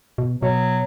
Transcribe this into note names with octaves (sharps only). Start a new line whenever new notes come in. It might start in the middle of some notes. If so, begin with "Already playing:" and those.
B2
B2 F#3